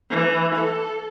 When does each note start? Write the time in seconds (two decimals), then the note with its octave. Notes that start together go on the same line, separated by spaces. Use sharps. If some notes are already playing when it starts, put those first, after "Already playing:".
0.10 E3
0.56 A4